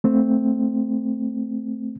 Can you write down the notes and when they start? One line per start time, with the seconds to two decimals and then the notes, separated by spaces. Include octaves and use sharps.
0.04 A3 C4